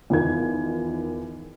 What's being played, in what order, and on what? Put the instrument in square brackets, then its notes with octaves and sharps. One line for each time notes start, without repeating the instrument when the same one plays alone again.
[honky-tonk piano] E2 D#3 F4 G#6